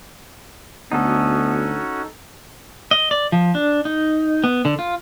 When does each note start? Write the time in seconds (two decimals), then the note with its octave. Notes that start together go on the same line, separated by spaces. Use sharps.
0.92 D2 B3 C#4 D#4 F#4 A4
2.91 D#5
3.11 D5
3.32 F3
3.55 D4
3.85 D#4
4.44 B3
4.65 D3
4.79 F4